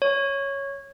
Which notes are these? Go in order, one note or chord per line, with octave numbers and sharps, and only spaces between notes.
C#5